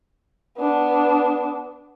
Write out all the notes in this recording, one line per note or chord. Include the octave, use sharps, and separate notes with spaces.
B3 D4